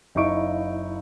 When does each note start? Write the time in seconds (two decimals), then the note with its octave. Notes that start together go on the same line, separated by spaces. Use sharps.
0.15 F#1 D#4 E4 F5 C#6 D7